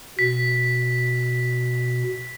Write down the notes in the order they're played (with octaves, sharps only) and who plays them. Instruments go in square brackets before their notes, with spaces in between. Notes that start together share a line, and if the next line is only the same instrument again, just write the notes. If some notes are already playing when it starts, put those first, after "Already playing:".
[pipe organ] B2 [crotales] B6